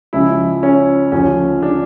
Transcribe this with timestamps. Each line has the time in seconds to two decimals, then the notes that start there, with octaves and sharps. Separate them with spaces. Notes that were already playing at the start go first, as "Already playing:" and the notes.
0.13 C#2 C#3 F3 E4
0.63 C#4
1.12 D2 C#3 F3 C#4
1.63 D4